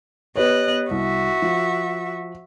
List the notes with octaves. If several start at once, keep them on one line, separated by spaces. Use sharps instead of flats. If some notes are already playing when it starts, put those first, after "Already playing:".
B3 G4 B4 C#5 D#5 F#6
C2 F#4 E5
F3